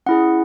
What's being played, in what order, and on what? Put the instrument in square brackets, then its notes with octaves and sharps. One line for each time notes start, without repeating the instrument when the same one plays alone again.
[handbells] C#4 E4 G#4 F#5